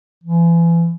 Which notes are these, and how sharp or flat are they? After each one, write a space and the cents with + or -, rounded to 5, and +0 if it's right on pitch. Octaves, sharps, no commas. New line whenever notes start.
E3 +35